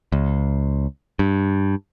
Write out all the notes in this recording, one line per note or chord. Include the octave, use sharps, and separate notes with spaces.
C#2
G2